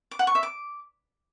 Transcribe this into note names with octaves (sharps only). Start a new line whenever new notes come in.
D6
F#5
C#6
E5
D6